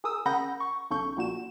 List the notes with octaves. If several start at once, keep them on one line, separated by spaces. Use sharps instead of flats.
G#4 A#4 D#6 E6
C#3 A#4 F#5 B5 G6 A#6
C#6
B1 C#3 A4 C#6 G6
A#1 A#2 F#4 E7